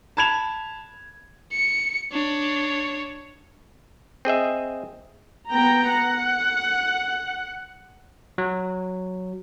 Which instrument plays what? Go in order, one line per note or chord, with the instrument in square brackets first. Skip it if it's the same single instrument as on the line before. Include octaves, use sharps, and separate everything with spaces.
[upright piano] A5 B5 G#6 E7 F7
[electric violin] C#7
D4 C#5
[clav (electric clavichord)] C4 G#4 D#5 E5
[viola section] B3 G5 A#5
F#5
[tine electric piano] F#3